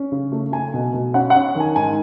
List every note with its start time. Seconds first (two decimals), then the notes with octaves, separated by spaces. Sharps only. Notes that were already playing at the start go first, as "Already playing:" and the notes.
Already playing: C#4
0.12 C#3
0.32 A3
0.52 A3 G#5
0.74 B2
0.94 B2
1.14 C#4 F#5
1.30 F#5
1.36 C#4
1.55 D#3
1.60 G#5
1.76 G#2 G#5